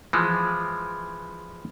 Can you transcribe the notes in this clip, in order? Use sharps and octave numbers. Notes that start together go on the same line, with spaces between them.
E3 F3 G#3